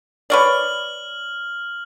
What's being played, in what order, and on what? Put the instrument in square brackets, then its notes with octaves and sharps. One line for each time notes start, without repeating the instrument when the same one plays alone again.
[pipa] B4 C#5 D5 [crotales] F6 F#7